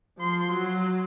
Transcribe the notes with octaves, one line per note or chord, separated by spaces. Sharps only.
F3 C6
F#3